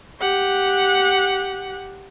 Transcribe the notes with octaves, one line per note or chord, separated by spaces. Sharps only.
G4 F#5